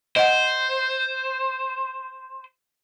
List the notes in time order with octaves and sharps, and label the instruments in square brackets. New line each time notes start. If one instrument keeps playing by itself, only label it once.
[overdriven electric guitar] C5 [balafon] D#5 F#5